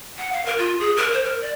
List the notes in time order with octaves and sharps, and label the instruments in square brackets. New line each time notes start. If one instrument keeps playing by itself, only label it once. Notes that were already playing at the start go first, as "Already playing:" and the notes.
[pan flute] F#5
F5
A#4
F4
G#4
A#4
C5
A#4
D5